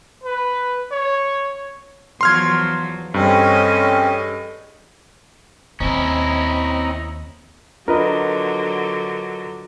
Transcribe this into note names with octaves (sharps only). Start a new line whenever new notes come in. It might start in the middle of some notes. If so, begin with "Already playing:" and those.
B4
C#5
E2 F3 F#3 C6 F6 G#6
G2 C4 C#4 G#4 A4 D#5
D#2 C4 C#4 E4 D#5 A#5
D3 F#3 D4 F4 A#4 B4 D#5